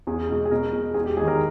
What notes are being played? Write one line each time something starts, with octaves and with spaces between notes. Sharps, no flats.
E2 G#4
B2 G#3
G#4
B2 A#4
G#3
E2 G#4
G4
D#3 G#3 G#4
A#4